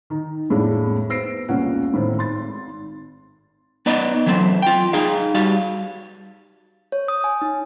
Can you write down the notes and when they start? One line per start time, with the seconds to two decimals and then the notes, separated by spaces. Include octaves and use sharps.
0.10 D#3 D#4
0.50 F2 A2 G#3 A#3 D4
1.09 B3 C4 E6 A#6 C7 D7
1.49 E1 C2 A#3 C#4 F4 F#5
1.94 A2 D#3 C4
2.18 G#1 C6 A6
3.86 B3 D#4 D5 D#5
4.26 E3 F#3 A3 C4
4.62 F4 G5
4.93 D#4 G#4 F5
5.35 G3 F#4 F5
6.92 C#5
7.08 D#6
7.24 G#5
7.42 D#4